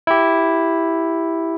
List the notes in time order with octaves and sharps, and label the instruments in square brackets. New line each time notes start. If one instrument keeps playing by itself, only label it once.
[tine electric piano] E4 G4